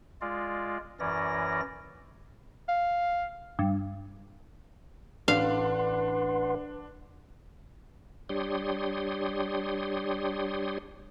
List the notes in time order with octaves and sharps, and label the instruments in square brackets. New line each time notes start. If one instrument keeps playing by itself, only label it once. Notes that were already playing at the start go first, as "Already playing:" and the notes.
[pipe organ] G#3 F4 D5
F#2 E3 C#4 D5 A#6
[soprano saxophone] F5
[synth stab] G2
[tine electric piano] A1 [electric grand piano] D4 [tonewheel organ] B4 F#5 C6 [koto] F5
[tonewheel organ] G3 D4 G4 C#5 C6 D#6